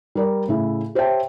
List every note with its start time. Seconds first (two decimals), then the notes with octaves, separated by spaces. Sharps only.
0.15 G3 A#4 D5
0.48 A2 C#3 E4
0.95 G4 C5 C#5 E5 G5 A5